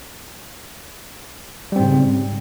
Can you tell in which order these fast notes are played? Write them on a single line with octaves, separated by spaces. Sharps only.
G3 C4 G#2 C#3